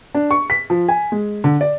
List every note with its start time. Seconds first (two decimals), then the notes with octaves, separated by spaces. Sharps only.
0.15 D4
0.31 C#6
0.50 B6
0.70 F3
0.88 G#5
1.12 G#3
1.44 D3
1.61 D5